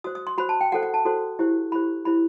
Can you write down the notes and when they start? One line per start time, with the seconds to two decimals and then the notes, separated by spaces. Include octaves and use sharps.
0.04 F#4 C5 D#6
0.15 D#6
0.27 C6
0.38 F#4 C5 B5
0.49 A5
0.61 G5
0.72 F#4 A4 C5 F#5
0.83 F#5
0.94 A5
1.05 F#4 A4 C5
1.39 E4 G4 C5
1.72 E4 G4 C5 B5
2.05 E4 G4 C5 B5